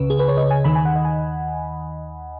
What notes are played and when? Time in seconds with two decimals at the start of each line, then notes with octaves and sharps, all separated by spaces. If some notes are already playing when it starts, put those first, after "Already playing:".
Already playing: C#2 C#3 B4
0.10 G#4
0.19 B4
0.28 C#5
0.37 D#5
0.51 G#5
0.64 D#2 D#3 B5
0.75 G#5
0.85 F#5
0.96 D#5
1.05 G#5